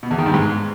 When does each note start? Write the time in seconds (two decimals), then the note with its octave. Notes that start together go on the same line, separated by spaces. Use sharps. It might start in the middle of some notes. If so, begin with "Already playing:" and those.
0.03 B2
0.11 E2
0.18 D#3
0.26 G2
0.34 G#2